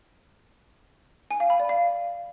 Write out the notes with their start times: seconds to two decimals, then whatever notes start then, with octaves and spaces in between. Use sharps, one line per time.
1.31 G#5
1.40 F5
1.50 B5
1.60 D5
1.69 F5